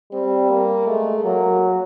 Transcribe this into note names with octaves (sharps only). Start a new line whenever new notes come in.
G3 C4
A#3
G#3 A3
F#3 A#3